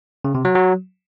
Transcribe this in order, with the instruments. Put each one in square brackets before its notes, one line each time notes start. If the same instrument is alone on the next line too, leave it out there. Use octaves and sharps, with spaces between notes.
[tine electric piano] C#3
C3
F#3
F#3